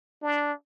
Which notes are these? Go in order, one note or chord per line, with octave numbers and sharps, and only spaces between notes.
D4